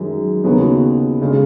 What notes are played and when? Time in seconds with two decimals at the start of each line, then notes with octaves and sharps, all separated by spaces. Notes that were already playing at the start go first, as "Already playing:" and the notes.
Already playing: F#2 D#3 G#3
0.44 D#2 C#3 F#3 B3
1.22 C#3 G#3